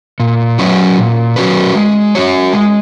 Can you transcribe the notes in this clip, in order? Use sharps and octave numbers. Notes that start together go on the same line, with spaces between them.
A#2
F#3 C#4 F#4 B4
A#2
F#3 C#4 F#4 B4
G#3
C#4 F#4 C#5
G#3